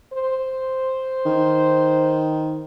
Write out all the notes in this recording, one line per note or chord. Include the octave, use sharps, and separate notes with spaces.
C5
D#3